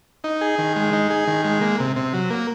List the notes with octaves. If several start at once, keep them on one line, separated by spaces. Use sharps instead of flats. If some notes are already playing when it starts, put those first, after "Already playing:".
D#4
G#4
D#3
G#3
D#4
G#4
D#3
G#3
A#3
C3
C3
F#3
A#3